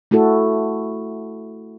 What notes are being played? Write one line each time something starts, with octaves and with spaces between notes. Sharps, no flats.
A3 E4 F#4 A4